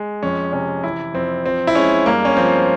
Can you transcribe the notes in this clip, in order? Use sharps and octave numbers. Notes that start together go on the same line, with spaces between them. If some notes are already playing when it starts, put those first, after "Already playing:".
Already playing: G#3
F2 C#4
C3 C#4
E3 E4
F2 C4
F3 C4
E4
G#3 C#4
G2 A#3
C#4
F3 C4